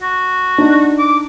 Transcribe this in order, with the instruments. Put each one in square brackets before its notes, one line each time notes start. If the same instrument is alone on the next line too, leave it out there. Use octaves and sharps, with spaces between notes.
[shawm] F#4
[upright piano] D4 D#4
[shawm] D6